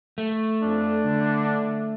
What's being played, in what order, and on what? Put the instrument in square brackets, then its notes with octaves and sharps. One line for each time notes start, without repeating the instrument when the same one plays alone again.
[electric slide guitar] A3
[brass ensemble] F2 [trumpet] D4
[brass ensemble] D3